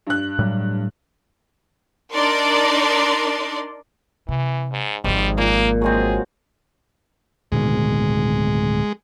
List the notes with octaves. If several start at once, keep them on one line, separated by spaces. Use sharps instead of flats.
G2 F#6
A2 F#3 G3
D4 D#4 A#4 D5 C6
C3 E3
G#2
G#1 G#2 F3 G3
A#2 A#3
F#3 G#3 C4 G#4
D1 B2 D#3 G#3